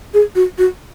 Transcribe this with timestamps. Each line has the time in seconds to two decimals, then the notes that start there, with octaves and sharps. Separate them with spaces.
0.14 G#4
0.35 F#4
0.58 F#4